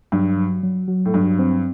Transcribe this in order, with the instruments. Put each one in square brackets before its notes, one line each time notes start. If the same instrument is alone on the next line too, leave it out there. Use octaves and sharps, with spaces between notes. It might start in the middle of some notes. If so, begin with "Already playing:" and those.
[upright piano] G2 [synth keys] F#3
[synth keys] F#3
F#3
F#3
[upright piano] A2
[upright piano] G2 [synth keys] F#3
[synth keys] C4